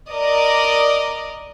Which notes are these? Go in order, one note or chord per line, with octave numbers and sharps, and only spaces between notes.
A#4 D5 D#5